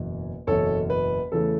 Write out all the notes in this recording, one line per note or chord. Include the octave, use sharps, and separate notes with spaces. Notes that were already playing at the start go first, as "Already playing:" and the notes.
Already playing: F#1 E2 B2
F#1 E2 B2 A4 C#5
B4
E2 C#3 E3 A3 A4